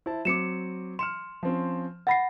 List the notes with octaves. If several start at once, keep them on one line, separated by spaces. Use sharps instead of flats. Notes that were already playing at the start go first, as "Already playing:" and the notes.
E4 C5 A5
F#3 C4 D6 C#7 E7
C6 F6 C#7 E7
F3 C4 C#4
F#5 B5 A6 A#6 C7